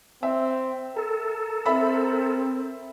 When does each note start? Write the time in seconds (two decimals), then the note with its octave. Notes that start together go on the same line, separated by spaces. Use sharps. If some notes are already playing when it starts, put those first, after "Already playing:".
0.23 C4 E5
0.97 A4 A#4
1.66 C4 E5 B5